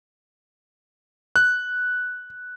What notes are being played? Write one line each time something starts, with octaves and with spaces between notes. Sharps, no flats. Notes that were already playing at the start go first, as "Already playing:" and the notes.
F#6